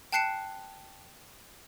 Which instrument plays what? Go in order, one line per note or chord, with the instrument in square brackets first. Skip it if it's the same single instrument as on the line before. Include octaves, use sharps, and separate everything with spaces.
[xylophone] G5 A5 F#6 C7 C#7 E7